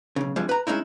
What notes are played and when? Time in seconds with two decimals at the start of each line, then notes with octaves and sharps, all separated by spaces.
0.16 B1 C#3
0.36 G2 C3 F3 G3 G#3
0.49 B4 A#5
0.67 G#3 A3 C#4 D#4 E4